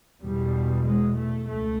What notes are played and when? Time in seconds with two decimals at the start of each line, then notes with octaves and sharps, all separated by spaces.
0.22 E2 B2 G3
0.85 G#3
1.16 A3
1.47 C#2 A3